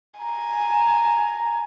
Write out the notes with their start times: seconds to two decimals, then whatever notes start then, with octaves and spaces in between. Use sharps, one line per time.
0.20 G#5 A#5